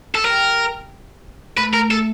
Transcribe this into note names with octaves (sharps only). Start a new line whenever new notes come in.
A4
G3 A#4
A3 B4
A#4
A4